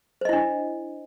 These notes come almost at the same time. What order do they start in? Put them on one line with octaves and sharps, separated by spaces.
C5 D#5 E4 D4